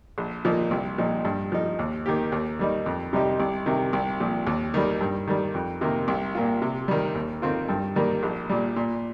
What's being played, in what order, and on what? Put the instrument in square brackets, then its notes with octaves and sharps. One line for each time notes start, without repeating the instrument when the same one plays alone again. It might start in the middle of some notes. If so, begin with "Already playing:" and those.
[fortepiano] A#1
A#2 F3 A#3 D#4
C2
A#2 F3 D#4
G2
F3 D#4
D#2
D#3 A#3 G4
D#2
D#3 G3 D#4
F2
C3 G3 D#4 G4
C2
C3 D#3
C2
A#2 F3
D#2
D#3 G3
G2
D#3 G3
F2
C3 D#3 A#3
C2
A#2 A#3 F4
C3
D#3 G3
D#2
D#3 C4 F4
G2
D#3 G3 A#3
A#1
A#2 G3
A#2